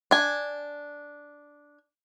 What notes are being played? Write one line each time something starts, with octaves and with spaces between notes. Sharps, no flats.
D4 G#5